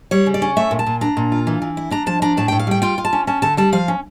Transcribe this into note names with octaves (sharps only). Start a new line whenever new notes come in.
G3 C#5
C#3
D5
C#4
A3 E5
A#2
A5
A#2
D4 A#5
A#2
F4
E3
E3
E4
D4 A#5
F3 A5
D4 A#5
A2 A5
G5
A2
F5
G3 G5
F4 G5
F4
A5
C#4
C#4 A5
D3 A5
G3 A5
F3 F5
C#4